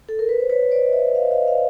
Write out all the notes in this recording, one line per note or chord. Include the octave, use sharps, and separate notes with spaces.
A4
A#4
B4
C5
B4 C#5
C5 D5
D#5
D5 E5
D#5 F5
E5
D#5 F5
D#5 F5